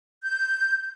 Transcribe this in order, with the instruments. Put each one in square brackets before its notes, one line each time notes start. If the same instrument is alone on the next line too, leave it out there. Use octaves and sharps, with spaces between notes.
[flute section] G6